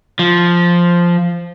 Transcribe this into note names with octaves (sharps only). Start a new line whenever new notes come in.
F3